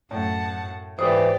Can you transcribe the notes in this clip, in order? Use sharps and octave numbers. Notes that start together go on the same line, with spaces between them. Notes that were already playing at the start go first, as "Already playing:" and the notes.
F#2 A2 F#5 A5
G#2 E3 G4 B4 C5 D5 D#6